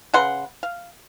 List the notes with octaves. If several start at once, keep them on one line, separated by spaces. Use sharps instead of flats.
C#3 B4 F#5 C6
F5